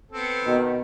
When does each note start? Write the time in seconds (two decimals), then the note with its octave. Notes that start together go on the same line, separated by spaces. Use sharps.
0.12 B3 C4 A4
0.45 B2 D#3